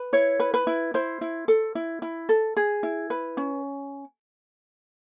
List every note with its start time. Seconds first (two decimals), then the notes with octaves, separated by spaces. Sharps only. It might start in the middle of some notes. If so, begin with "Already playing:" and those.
Already playing: B4
0.13 E4 C#5
0.40 B4
0.54 B4
0.67 E4
0.94 E4 C5
1.21 E4
1.48 A4
1.75 E4
2.02 E4
2.29 A4
2.57 G#4
2.83 E4
3.10 B4
3.37 C#4